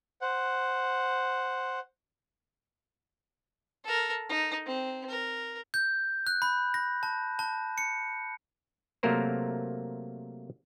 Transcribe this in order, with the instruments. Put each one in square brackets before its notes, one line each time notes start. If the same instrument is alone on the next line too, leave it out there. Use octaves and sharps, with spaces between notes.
[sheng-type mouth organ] C5 F#5
[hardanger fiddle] A4 A#4
D#4
C4
A#4
[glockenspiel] G6
F#6
B5
A#6
A5
A5
C#7
[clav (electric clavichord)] C3 F#3 A3 A#3 A#4 C5